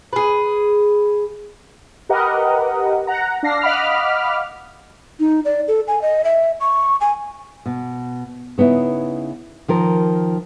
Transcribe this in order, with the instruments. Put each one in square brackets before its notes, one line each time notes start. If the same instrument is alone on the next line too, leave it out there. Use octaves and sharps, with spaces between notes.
[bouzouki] G#4 B4
[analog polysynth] G4 A#4 B4 D#5 F#5
F#5 A#5
D4 F5 A#6 C7
D#5 F5 F#5 B5 D6 F6
[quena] D#4
D5
A4
G#5
D#5
E5
C#6
G#5
[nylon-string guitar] B2
C#3 B3 D#4 E4
D#3 F3 A#4